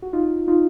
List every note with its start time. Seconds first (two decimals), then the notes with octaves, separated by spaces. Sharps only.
0.02 F#4
0.13 D#4 F4
0.48 D#4 F4